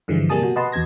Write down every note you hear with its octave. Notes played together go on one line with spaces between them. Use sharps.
G2 D3 E3 F3 G#3
C3 G3 A#3 G#4 A5 D#6
B2 F#4
B4 D#5 F#5 A5 C6
E2 B2 A5 G#6 A#6